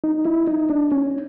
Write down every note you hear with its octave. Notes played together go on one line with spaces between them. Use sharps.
D#4
E4
D#4
D4
C#4